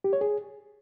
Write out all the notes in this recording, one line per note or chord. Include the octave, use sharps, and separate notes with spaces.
G4
C#5
G#4